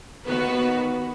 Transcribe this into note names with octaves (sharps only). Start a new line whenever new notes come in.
D#2 D#3 B3 F#4 B4